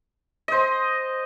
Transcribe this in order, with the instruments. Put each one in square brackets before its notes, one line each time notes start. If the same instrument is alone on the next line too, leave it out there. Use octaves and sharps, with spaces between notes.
[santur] C5 D#5